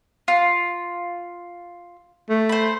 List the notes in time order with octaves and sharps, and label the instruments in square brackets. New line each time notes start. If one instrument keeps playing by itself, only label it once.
[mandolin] F4
[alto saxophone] A3
[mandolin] C5 B5